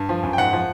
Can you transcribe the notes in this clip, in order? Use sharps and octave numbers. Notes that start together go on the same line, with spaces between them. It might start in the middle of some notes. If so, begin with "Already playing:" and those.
Already playing: G2
F3
F#2
G5
G#2 F#5
F3